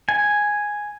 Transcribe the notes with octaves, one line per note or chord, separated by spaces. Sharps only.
G#5